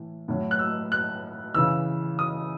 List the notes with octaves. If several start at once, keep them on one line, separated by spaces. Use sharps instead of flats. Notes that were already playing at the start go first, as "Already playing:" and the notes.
Already playing: A2 E3
A2 F#3
F#6
E6
F#6
C#3 E3 E6
D#6